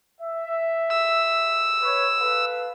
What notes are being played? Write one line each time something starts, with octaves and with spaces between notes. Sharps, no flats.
E5
E6
B4 C#5
A4 B4 F5